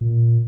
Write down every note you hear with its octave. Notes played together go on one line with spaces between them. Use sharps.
A#2